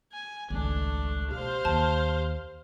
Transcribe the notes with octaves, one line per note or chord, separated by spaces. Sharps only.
G#5
G#1 C#2 G#3 A3 D4
B2 G4 C5 F5
D#2 A5